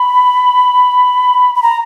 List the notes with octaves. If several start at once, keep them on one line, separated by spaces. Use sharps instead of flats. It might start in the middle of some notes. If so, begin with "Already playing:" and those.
Already playing: B5
B5
A#5